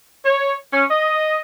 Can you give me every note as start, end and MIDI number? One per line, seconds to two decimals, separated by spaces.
0.25 0.53 73
0.72 0.84 61
0.89 1.39 75